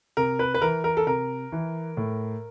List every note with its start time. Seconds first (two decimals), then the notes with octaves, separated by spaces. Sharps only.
0.17 C3 A#4
0.39 B4
0.54 B4
0.62 E3 A#4
0.84 A#4
0.97 A4
1.07 C3 A#4
1.52 E3
1.97 A2